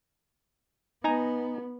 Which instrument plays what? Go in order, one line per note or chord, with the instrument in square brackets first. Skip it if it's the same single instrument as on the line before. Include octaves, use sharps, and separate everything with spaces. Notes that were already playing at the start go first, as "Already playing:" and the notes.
[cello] B3 [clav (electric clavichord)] D#4 G#5 A#5